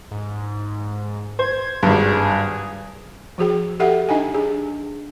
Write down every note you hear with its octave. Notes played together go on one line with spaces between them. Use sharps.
G#2
C5 G#6
G#1 G2 G#4
F3 F#4 G#4 G5
G4 A4 E5 F#5 G5
D4 D#4 D#5 G5 G#5
D4 G#4